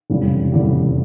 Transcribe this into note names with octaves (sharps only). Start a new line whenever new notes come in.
F1 E2 C#3 G3
F1 E2 C#3 G3